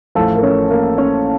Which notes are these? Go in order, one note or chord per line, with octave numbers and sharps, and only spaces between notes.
A1 A2 F3 A3 A4
A#4
C#4 C#5
A#3 A#4
C#4 C#5